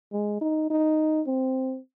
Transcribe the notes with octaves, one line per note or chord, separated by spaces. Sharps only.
G#3
D#4
D#4
C4